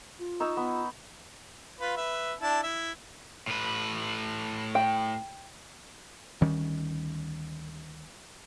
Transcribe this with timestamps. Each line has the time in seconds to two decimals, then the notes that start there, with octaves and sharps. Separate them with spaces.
0.19 F4
0.40 D#4 C#5 E6
0.57 B3
1.81 F4 B4
1.97 B4 E5
2.41 D4 E4 A5
2.63 E4 E5
3.48 A2 B4
4.75 G5
6.41 D2 D#3 G3 C#4